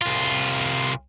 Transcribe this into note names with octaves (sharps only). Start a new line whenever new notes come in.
C2 F4